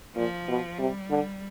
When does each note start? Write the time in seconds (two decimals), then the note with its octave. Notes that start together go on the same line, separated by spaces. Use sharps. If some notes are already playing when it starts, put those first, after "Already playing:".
0.16 A#2 F3
0.48 B2
0.79 C3 G3
1.10 D3